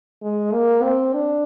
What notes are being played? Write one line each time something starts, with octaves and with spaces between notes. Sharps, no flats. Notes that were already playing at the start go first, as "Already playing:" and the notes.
G#3
A#3
C4
D4